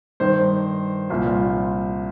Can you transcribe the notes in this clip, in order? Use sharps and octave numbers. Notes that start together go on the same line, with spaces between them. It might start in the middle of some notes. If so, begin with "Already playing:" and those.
G2 D#3 C5
C2 A#2 F3